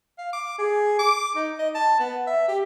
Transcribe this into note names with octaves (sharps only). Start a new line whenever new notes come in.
F5
D6
G#4
D6
D#4
D#5
A5
B3
E5
G4